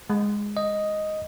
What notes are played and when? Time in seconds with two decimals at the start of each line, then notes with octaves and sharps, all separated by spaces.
0.10 G#3
0.57 D#5